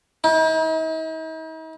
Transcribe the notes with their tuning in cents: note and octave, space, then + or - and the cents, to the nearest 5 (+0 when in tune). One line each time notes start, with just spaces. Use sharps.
D#4 +45